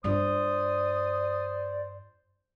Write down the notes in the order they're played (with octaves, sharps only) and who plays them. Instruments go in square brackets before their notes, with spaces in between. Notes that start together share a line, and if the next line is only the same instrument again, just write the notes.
[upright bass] G2 F4 [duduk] C5 [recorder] D5 [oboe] D#6